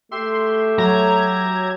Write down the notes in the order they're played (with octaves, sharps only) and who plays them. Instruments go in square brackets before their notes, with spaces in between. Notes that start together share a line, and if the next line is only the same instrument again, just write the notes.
[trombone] A3 [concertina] G4 E5 [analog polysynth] C6
[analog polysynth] F#3 G#6 [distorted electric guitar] A#5